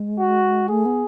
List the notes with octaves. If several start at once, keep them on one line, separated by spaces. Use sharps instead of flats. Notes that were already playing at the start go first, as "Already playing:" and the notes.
Already playing: G#3
F#4
A3 G#4
B3